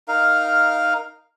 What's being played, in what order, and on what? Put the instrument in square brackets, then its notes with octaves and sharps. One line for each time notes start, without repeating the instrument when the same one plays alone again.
[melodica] D#4 A#4 F5